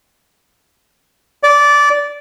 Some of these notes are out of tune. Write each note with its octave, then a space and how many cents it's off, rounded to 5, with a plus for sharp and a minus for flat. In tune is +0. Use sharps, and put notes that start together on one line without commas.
D5 -15